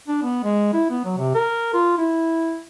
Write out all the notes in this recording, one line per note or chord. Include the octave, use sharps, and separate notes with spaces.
D4
B3
G#3
E4
B3
F#3
C3
A#4
F4
E4